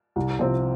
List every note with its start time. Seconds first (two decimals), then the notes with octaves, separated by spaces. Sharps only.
0.16 C2
0.39 C3 F3 C4